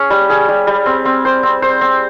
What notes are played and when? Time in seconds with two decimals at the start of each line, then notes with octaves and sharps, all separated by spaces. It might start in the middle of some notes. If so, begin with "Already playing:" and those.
Already playing: C#4 G#4
0.10 G3
0.30 G#4
0.49 G3
0.67 G3
0.86 C4
1.05 C4
1.25 C5
1.43 C4
1.62 C5
1.81 C4